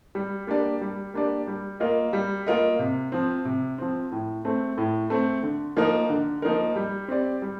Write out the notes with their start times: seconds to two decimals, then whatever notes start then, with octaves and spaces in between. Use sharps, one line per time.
0.15 G3
0.47 A#3 D4 G4 D5
0.81 G3
1.14 A#3 D4 G4 D5
1.47 G3
1.80 A#3 F4 A#4 D#5
2.13 G3
2.47 A#3 F4 A#4 D#5
2.79 C3
3.12 F3 C4
3.45 C3
3.78 F3 C4
4.12 A2
4.45 A3 C4
4.78 A2
5.10 A3 C4
5.43 D3
5.77 F3 A#3 D#4 A#4
6.10 D3
6.42 F3 A#3 D#4 A#4
6.76 G3
7.08 C4 G4 D5
7.42 G3